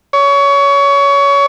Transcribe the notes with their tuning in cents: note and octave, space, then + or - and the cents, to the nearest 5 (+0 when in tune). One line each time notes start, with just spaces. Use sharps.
C#5 +25